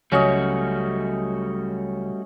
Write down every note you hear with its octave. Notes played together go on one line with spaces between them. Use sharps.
C#2 C#3 F#3 G3 A3 C#4 F#4 D#5